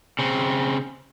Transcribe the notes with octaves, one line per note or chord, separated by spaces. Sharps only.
C#3 C4